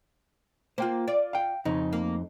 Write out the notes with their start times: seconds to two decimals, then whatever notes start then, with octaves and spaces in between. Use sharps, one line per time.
0.78 A#3 F4 C5 G5
1.08 F4 D5
1.33 F5 G5
1.65 F2 C#3 D#4
1.93 A#3